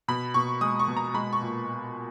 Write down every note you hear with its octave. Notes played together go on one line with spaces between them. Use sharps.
B2 B5
B2 C#6
G#3 D#6
C#6
B2
A#5
G#3 B5
C#6
A#2